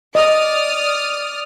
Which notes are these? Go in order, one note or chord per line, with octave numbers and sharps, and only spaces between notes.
D5 D#5 D#6 F6